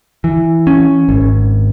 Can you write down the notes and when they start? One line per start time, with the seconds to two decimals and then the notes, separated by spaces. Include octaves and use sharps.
0.24 E3
0.67 C#4
1.09 G#1